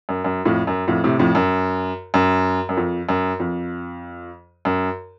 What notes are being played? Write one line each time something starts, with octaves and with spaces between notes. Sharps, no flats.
F#2
F#2
F2 A2
F#2
F2 A2
A2 C3
F2 A2
F#2
F#2
F#2
F2
F#2
F2
F#2